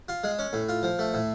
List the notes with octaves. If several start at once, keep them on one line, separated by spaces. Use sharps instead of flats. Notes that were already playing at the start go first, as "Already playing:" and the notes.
F4
G#3
C#4
A2
F4
F3
A3
A2